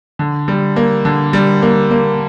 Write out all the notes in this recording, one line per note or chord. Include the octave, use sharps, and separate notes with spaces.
D3
G3
A#3
D3
G3
A#3
A#3